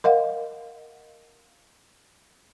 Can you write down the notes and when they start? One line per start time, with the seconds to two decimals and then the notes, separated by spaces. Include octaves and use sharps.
0.04 A#4 D#5 F5 F#5